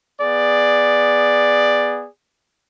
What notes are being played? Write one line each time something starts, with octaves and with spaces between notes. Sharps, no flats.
B3 G#4 D5